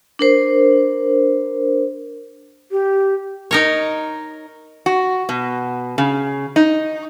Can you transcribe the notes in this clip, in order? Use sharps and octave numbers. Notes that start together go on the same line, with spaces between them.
D4 A#4 C5
G4
D#4 A#4 C#5
F#4
B2
C#3
D#4